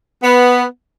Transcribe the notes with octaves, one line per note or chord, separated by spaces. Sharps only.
B3